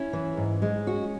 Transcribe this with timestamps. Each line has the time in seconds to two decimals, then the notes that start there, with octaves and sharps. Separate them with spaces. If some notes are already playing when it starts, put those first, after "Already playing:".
Already playing: C#4 E4
0.13 E3
0.37 G#2
0.62 G#3
0.87 C#4 F#4